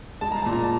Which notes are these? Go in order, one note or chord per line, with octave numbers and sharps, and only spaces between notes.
G#3 A5
A#5
A#2 A5
A#5
A5